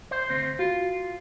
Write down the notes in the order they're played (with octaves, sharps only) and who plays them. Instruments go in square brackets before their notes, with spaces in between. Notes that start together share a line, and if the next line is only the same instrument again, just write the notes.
[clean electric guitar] C5
D2 C4 C5
[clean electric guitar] F4 [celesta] F#4